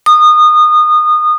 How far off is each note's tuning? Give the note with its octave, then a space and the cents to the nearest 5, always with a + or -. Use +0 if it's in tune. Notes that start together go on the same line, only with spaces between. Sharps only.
D#6 -25